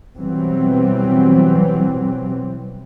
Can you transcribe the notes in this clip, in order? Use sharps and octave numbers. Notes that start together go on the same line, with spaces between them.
B2 E3 F#3 G3 C4